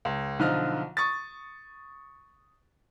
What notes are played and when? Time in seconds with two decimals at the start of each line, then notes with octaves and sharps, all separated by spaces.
0.05 C#2
0.39 B1 D3 F3 D#4 F4 F6
0.97 C#6 D#6 A6